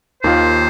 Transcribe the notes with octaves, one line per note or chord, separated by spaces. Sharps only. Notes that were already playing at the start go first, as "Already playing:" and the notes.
D#2 D#3 A#3 F4 C5